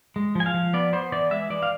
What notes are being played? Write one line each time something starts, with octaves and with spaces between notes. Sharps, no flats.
G#3
F3 G#5
F5
F3
B3 D5
B3 C5
E3 D5
G#3 E5
E3 D5
F5